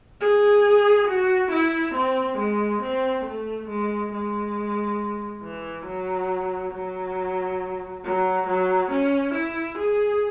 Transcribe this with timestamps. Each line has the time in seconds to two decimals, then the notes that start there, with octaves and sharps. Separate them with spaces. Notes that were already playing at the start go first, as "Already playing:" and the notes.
0.20 G#4
1.08 F#4
1.51 E4
1.95 C4
2.38 G#3
2.82 C4
3.25 A3
3.69 G#3
4.12 G#3
5.43 E3
5.86 F#3
6.73 F#3
8.04 F#3
8.47 F#3
8.92 C#4
9.34 E4
9.78 G#4